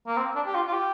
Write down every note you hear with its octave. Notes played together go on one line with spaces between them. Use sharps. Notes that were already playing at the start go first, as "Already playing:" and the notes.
A#3
C4
D4
G4
F4
F4
G4